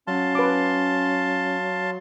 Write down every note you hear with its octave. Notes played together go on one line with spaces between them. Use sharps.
F#3 C#4 F5 A5 C6
B4 D6